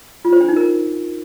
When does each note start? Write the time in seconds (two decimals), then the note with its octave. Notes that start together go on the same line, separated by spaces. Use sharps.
0.25 F4
0.33 C5
0.41 D4
0.49 D#4
0.56 A#4